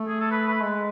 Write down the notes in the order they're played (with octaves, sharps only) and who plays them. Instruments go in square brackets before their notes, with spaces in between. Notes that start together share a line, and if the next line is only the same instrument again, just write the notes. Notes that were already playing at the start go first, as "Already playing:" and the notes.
Already playing: [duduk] A3
[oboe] G#4
A4
B4
B4
[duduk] G#3